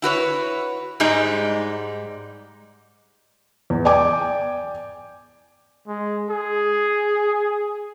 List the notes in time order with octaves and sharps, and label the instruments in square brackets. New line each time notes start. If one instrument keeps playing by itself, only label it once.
[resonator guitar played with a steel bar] E4 F#4 B4 C#5
G#2 G3 G#3 D#4
[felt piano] E2
D5 G5 G#5 D6
[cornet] G#3
G#4